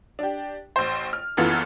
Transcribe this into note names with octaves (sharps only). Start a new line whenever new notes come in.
D4 G4
A1 C5
F6
F#1 F#2 E3 B3 F4 A4